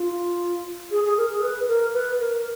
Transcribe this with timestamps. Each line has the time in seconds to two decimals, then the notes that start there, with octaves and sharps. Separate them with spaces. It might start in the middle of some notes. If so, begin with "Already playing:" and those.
Already playing: F4
0.91 G#4
1.05 G#4
1.18 A#4
1.30 G#4
1.42 B4
1.68 A#4
1.94 B4
2.20 A#4